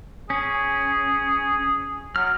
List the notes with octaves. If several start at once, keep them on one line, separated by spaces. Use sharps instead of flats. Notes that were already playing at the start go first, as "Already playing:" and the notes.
C#4 G#4
F#3 F6